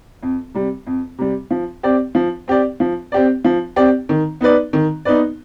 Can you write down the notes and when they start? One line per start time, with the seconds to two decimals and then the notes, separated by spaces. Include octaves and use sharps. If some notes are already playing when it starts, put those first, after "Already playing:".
0.23 F2
0.54 C3 G3
0.87 F2
1.18 C3 G3
1.51 F3
1.83 C4 G4 D5
2.15 F3
2.48 C4 G4 D5
2.80 F3
3.12 C4 G4 D5
3.45 F3
3.76 C4 G4 D5
4.09 D#3
4.41 B3 D#4 B4 D5
4.73 D#3
5.05 B3 D#4 B4 D5